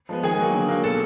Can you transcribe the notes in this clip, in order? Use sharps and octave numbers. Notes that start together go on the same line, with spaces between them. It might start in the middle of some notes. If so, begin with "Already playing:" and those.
F3 G#3 B3
D#3 G#4 G#5
F#3 A#3
D3
F#3 A#3
B2 A4 A5